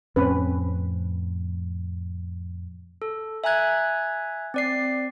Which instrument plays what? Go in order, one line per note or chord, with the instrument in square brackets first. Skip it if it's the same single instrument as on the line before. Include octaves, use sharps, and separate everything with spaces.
[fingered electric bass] F2 A2 [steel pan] C4 C#4 B4
[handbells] A4
E5 G#5 A#5 F#6 G#6
C4 D5 C7